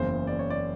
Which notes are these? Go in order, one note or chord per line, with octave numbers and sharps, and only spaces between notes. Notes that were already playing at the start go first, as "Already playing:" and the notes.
Already playing: F#1 E2 C#3 C5
D5
C#5
D5